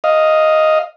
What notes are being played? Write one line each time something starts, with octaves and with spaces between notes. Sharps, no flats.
D#5 F5